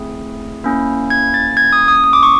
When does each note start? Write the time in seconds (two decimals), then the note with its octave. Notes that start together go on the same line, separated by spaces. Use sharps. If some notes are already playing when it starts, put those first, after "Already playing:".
Already playing: A3 C4 E4 G#4
0.64 A#3 C#4 E4
1.10 G#6
1.34 A6
1.57 G#6
1.73 D#6
1.88 D#6
2.04 D#6
2.13 D6
2.23 C#6